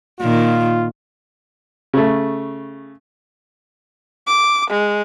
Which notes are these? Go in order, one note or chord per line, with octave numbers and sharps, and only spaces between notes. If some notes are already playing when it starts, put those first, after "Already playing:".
A#2 D#3 F4
C#3 A3
D6
G#3